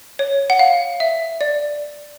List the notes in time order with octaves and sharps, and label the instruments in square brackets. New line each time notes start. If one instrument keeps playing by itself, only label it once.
[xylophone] C#5
F#5
F5
E5
D5